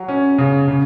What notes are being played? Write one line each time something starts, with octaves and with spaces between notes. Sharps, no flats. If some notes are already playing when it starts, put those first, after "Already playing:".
Already playing: F#3
C#4
C#3
C#3